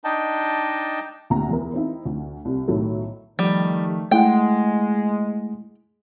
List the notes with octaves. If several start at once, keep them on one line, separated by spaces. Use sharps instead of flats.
D4 D#4 D#5 G5 A5
D2 A#2 G4 A#5
E2 E3 A#4
C4 D#4 E4
D2
C2 C3
B1 A2 D#3 F#3 D#4 A4
D#3 F3 G3 A3
G#3 A3 E4 F#5 G5